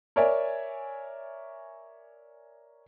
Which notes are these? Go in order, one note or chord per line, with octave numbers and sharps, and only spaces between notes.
A#4 C#5 D5 E5 G#5